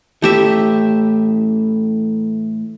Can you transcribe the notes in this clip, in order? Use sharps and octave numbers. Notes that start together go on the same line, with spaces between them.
A2 E3 A3 G4 E5